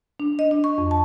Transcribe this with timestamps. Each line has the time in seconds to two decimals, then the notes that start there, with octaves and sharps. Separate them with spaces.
0.20 D4
0.39 D#5
0.51 D4
0.64 C#6
0.78 F2
0.91 A5